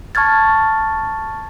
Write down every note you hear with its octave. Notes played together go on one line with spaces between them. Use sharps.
A5 C#6 F6 G#6 A6